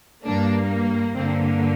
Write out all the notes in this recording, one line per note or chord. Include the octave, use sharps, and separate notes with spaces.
G2 G3 A#3 D4
G2 D3 A#3 C4